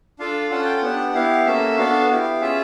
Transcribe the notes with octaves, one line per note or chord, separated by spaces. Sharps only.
D4 F4 A4 F5
C#4 F4 A4 F#5
G5
F#5
B3 D4 G4
B3 E4 G4 F5
A#3 C#4 F#4 A4 E5
B3 D4 F#4 A4 F5
B3 E4 G4
C#4 F4 G#4 E5